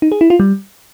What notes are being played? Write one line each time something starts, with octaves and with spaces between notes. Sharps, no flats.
D#4
G#4
E4
F4
G3